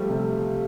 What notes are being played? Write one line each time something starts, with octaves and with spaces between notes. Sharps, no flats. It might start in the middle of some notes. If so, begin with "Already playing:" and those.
Already playing: F3 G3 A3
C3